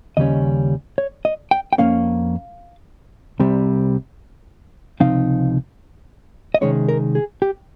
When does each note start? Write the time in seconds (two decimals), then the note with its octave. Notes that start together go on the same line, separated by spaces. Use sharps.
0.17 D#2 C#3 G3 C#4 D#5
0.98 C#5
1.25 D#5
1.51 G5
1.73 G5
1.78 F2 D#3 A#3 C#4 F5
3.40 C2 C3 G3
5.00 C#2 C3 F3 C4 D#4 F5
6.54 D#5
6.61 C3 D#3 G#3 C#4 C#5
6.89 A#4
7.15 G#4
7.42 G4